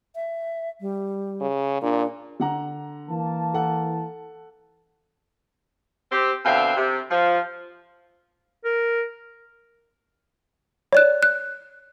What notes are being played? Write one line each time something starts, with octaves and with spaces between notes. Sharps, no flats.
E5
G3
C#3
A#2 D4
D3 F#5 A#5
E3 A#3 A5
A4 F#5
C4 G4
B2 D3 C4 E5 F5 G5
C3
F3
A#4
C#5 D5 F#6
F#6